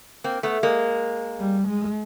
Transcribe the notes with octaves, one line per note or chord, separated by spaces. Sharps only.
A#3 C4
A3 B3
G#3 A#3
G3
G#3